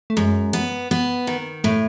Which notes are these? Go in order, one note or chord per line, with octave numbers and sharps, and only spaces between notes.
A3
F#2 G#3
B3
B3
D#3
A2 A3